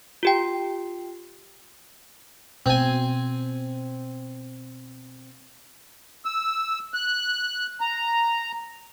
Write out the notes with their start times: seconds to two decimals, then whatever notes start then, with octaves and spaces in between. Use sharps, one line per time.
0.23 F4 G4 G5
2.66 B2 C4 G#5
6.25 E6
6.94 F#6
7.81 A#5